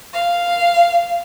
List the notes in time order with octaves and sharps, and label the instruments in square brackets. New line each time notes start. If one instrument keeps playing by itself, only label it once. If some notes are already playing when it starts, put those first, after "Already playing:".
[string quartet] F5